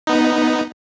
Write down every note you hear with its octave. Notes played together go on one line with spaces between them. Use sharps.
B3 D#4